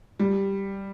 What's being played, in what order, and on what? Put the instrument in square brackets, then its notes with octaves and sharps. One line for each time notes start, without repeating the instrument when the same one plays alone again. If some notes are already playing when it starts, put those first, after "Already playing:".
[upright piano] G3